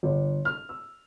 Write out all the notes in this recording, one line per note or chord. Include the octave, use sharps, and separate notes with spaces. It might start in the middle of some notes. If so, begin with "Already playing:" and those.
G1
F6
E6